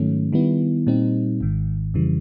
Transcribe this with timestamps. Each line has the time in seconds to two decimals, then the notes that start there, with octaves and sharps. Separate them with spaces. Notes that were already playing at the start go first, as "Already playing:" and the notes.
Already playing: G#2 D#3 F#3 A3 C#4
0.33 D#3 G3 B3 E4
0.87 A#2 G3 C4 D#4
1.41 G#1 G#2 D#3
1.94 F2 C#3 E3 G3